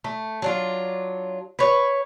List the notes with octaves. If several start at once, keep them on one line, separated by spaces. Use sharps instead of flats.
A3
F#3 D4 F4
B4 C#5